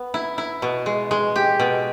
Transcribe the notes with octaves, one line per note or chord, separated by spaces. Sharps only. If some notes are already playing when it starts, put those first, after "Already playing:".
Already playing: B3
E4
E4
B2
G#3
G#3
G4
B2